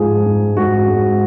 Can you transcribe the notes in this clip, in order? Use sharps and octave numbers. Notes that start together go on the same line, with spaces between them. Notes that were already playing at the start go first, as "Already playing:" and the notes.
Already playing: G#2 F3 G#4
G#2
G#2 F#4
G#2